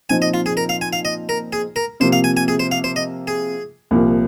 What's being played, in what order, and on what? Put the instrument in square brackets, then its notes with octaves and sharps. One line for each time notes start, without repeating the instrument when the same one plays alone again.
[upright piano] A#2 F3 C4 D#4 [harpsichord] G#5
[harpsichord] D#5
F4
G#4
A#4
F5
G#5
F5
D#5
A#4
G#4
A#4
[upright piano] C3 F3 A#3 [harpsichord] C5
[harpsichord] F5
G#5
G#5
G#4
C5
F5
C5
D#5
G#4
[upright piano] C2 A#2 F3 A#3